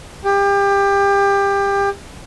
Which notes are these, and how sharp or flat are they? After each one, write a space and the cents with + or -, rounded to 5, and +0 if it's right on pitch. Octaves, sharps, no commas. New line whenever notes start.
G4 +25